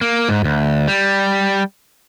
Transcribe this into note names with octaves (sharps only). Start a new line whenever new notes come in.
A#3
G#2
D2
G3